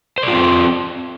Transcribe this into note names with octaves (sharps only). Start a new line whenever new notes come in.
C4 F4 C5 D5